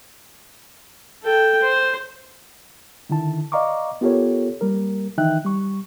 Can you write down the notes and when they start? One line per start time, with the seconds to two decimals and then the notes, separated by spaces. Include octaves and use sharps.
1.23 A4 G5
1.62 C5
3.10 D3 D#3 E4 A5
3.52 D5 D#5 F5 A#5 C#6 D6
4.01 B3 F4 G4 A4 A#4 C#5
4.61 G3 A#3 A#4
5.18 D#3 E3 D#4 E5 G5 F#6
5.45 G3 C#6